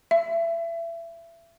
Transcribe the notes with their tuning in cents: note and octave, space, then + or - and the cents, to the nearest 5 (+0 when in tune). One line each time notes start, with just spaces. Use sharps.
E5 +30